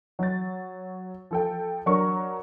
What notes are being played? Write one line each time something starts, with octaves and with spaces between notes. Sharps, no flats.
F#3 A6
F3 A4 G5
F#3 D4 A#4 A#5 C#6